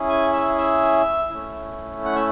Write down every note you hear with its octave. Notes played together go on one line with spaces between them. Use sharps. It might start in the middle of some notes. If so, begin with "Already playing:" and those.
Already playing: C#4 E4 G#4
G#5
E5
E5
A3 C#4 E4
F#5
E5